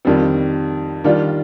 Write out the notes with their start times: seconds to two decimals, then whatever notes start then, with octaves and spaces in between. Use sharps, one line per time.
0.05 F2 D#3 G3 C4
1.04 D#3 G3 D4 F4